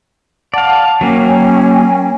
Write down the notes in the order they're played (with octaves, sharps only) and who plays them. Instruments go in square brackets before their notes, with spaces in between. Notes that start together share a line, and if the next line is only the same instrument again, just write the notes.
[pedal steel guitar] D5 F5 [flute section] F#5 A5
[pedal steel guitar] F#3 A#3 [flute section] C#4 G5 G#5